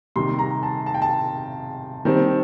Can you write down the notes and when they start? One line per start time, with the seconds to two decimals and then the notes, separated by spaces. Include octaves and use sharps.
0.16 C3 D#3 G3 C6
0.39 A#5
0.63 A5
0.86 A5
0.94 G5
1.02 A5
2.05 D#3 G3 C4